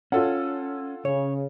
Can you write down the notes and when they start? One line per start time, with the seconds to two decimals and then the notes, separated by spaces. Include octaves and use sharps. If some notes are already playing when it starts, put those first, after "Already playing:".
0.12 C#4 F4 A4 F#5
1.05 C#3 C#5